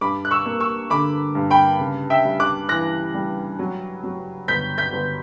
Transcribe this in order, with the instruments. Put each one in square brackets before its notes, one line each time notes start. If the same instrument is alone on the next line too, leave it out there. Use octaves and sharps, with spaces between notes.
[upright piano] G2 [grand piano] B5 D6
[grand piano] F#6
C#6 E6
[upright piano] A#3
[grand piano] C#6 E6
[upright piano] D3 [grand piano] B5 D6
[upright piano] G2
[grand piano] G5 B5
[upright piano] C#3
[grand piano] E5 G5
[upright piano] G3
[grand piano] D6 F#6
[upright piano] E3 [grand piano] F#6 A#6
[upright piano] G3
F#3
F#3
[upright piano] G1 [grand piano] G6 B6
[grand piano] G6 B6
[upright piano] G1